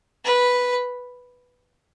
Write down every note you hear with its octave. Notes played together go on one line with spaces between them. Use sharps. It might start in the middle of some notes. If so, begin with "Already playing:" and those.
B4